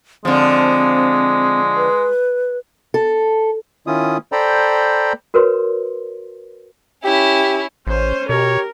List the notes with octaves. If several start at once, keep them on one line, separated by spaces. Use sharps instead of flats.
D3 F3 G#3 C4
B4
A4
D#3 C#4 E4 F4 D#6
A4 C5 D5 G5 A#5 B5
F#4 A#4 B4 C#5 C6
C#4 E4 G4
A1 C#4 C5
B2 G4 A#4 C#5